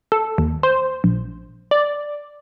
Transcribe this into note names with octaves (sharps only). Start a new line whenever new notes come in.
A4
D#2
C5
A#1
D5